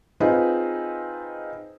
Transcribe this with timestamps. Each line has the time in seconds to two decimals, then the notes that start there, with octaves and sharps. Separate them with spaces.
0.20 C4 D#4 F4 G#4 B4